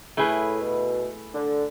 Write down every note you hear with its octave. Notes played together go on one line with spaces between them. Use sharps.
A2 A3 E4 G#4 B4
B2
D3